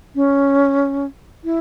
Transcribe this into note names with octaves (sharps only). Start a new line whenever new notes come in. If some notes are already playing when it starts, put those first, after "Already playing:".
C#4
E4